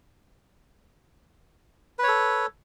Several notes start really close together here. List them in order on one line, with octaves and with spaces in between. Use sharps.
B4 C#5 A4